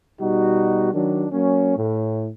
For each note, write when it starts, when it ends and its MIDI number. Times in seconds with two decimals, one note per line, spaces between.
0.20 0.91 47
0.20 0.91 55
0.20 0.91 63
0.20 0.91 66
0.92 1.26 51
0.92 1.26 54
0.92 1.26 62
1.30 1.74 54
1.30 1.74 58
1.30 1.74 61
1.77 2.27 45